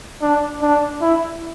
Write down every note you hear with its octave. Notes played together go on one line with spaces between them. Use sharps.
D4
D4
E4